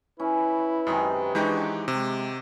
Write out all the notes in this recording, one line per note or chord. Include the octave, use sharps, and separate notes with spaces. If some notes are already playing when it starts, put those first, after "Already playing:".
C#4 E4 B4
F#2 C3 D#3 G#3
E3 G#3 D4 D#4 G4 F#5 C#6
C3 G#3